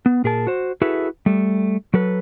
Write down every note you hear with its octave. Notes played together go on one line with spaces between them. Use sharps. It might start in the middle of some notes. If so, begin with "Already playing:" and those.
B3
A#2 G#4 A#4 A5
F#4 C5
E4 F#4 G#4 A4 B4 E5
G3 A3
F#3 A4 B4